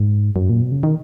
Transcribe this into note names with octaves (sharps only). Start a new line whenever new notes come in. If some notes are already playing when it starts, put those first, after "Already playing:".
Already playing: G#2
F#2
A#2
B2
C#3
D#3